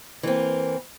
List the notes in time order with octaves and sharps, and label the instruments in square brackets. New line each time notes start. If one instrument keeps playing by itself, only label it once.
[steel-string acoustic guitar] E3 A#3 C4